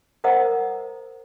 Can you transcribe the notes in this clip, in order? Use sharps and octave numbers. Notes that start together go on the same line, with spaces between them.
A#4 C5 D#5 F#5 A#5 D#6